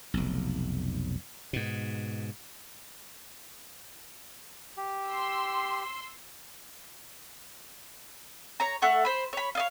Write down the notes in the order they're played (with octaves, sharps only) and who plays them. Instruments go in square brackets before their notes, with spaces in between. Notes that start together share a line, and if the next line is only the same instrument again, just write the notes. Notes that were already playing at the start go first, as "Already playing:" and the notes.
[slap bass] F1 B1
G#2 B2
[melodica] G4
[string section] C6 E6
[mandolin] C#5 A#5
A3 F#5 C#6
C5 B5
C#5 B5
C#5 D#5 F5